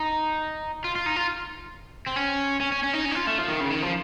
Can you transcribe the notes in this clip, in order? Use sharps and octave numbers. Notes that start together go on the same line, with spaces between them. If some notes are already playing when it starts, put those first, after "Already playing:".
Already playing: D#4
F4
F4
D#4
F4
C4
C#4
C#4
C#4
C#4
D#4
C#4
D#4
F4
A3
F3
D#3
C#3
D#3
F3